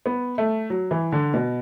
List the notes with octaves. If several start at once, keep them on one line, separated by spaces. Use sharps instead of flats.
B3
A3
F#3
E3
D3
B2